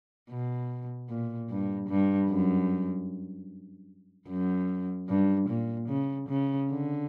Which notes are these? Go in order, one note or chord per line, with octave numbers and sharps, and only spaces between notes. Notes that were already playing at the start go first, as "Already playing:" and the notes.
B2
A#2
G2
G2
F#2
F#2
G2
A#2
C#3
C#3
D3